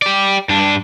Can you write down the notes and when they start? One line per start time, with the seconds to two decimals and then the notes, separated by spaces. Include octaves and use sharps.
0.02 G4 D5
0.49 G2 D4